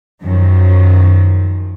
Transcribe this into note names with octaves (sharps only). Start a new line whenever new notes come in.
F#2 D#3 F3